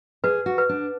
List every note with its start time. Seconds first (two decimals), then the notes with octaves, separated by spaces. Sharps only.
0.24 G#4 B4
0.46 F#4
0.58 B4
0.69 D4